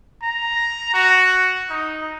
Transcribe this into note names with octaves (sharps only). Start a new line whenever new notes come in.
A#5
F#4
D#4